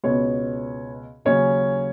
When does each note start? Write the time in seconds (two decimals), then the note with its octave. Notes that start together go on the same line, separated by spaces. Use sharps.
0.04 C#2 B2 B3 C#5
1.25 D#2 C#3 F#3 C#4 C#5